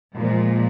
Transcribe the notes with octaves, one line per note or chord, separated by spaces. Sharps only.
A#2 F3 G#3